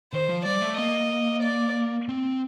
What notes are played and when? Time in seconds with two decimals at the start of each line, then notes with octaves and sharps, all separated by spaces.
0.13 D#3 C5
0.29 F3
0.45 G3 D5
0.61 A3
0.78 A#3 D#5
1.43 D5
2.09 C4